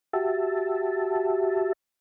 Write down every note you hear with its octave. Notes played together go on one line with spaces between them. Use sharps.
F#4 G4 E5 A5